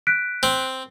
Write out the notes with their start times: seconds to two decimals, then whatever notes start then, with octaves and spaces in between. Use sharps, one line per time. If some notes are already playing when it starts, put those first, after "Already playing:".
0.07 F#6 B6 D7
0.43 C4